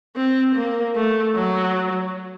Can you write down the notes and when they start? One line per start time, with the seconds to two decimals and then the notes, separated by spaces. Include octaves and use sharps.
0.16 C4
0.55 A#3
0.95 A3
1.35 F#3